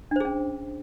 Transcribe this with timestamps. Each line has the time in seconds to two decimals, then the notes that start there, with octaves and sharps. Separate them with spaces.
0.11 D4
0.16 C5
0.20 G#4
0.25 C#4